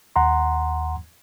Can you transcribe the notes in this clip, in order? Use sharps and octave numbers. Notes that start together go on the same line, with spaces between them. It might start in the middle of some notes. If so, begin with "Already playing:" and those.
D#2 F#5 A#5 C6